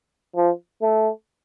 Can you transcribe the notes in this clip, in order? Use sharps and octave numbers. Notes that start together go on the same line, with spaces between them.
F3
A3